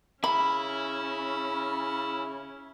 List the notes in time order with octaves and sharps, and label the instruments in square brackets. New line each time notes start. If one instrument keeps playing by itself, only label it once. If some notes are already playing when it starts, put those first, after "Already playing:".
[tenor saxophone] C#3 [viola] C#4 [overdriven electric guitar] E4 [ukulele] B5